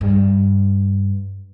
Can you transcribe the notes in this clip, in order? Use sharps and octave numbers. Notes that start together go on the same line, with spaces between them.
G2